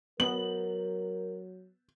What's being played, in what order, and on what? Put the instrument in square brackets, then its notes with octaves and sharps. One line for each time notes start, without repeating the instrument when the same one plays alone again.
[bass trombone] F#3 [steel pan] B3 [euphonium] A#4 [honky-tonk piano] F#7